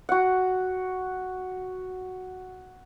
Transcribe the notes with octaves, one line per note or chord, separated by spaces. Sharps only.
F#4 F#5